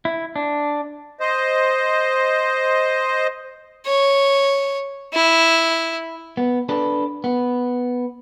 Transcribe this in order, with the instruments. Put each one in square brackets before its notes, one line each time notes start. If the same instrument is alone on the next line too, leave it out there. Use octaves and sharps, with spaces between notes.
[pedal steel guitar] E4
D4
[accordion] C5 D#5
[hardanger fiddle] C#5
E4
[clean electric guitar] B3
D4 A4 B4
B3